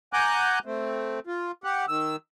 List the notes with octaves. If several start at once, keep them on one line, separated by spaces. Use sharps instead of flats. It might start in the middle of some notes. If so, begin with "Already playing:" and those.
F#5 G#5 A#5 D6 F#6 G6
A3 C4
F4
G4 F#5
D#3 E6